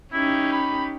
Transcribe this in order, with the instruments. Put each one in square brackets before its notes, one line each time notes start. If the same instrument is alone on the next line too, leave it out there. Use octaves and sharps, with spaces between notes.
[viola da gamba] C#4 D#4 G4 [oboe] E4
[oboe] B5